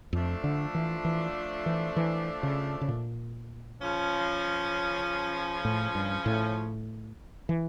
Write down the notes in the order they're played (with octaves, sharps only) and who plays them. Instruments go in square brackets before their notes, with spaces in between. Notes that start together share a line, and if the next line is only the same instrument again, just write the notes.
[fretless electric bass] F2 [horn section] F3 A3 D4
[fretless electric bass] D3
E3
E3
E3
E3
C#3
C#3
A#2
[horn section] C#3 F3 C#4
[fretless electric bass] A2
G2
A2
E3